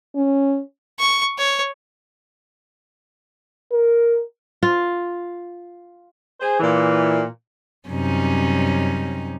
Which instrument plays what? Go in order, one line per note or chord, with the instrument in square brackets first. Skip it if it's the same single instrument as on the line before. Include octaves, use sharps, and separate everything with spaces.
[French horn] C#4
[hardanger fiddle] C#6
C#5
[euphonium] A#4
[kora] F4
[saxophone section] G#4 C5
A#2 E3
[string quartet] F#2 C3 G3 C#4 D#4